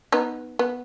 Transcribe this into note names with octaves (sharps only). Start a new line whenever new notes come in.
B3 D#4
B3